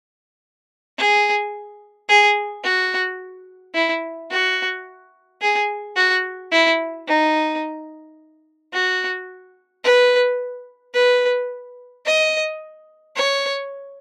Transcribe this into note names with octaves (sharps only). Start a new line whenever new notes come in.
G#4
G#4
F#4
E4
F#4
G#4
F#4
E4
D#4
F#4
B4
B4
D#5
C#5